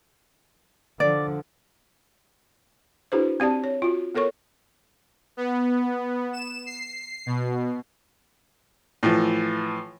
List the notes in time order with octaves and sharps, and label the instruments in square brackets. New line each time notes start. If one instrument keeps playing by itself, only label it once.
[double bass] D3 F3 [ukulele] D5
[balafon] D4 E4 F#4 G#4 B4 C5
C4 G4 D5 A5
C#5
F4 F#4
B3 A4 A#4 C#5 C#6
[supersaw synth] B3
E7
C7
B2
[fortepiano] A2 E3 F3